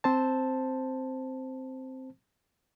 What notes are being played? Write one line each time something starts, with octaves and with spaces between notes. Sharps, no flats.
C4 C5 A5